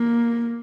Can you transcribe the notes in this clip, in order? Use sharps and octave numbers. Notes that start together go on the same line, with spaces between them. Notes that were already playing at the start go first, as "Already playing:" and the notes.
Already playing: A#3